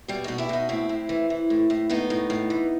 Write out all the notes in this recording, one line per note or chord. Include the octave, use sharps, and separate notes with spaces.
B2 G3
B2 D#4 F#4
E4 G4
B2 D#4 F#4
A2 C4 E4
A2
E3
E3
A2
A2
A2 B3 D#4
A2
A2
E3